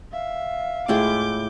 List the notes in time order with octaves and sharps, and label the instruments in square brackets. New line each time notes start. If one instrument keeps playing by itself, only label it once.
[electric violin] E5 [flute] F5
[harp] A2 [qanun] G#3 E4 F4 [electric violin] D6 G6